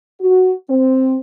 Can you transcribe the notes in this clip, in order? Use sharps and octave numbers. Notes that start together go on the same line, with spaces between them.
F#4
C4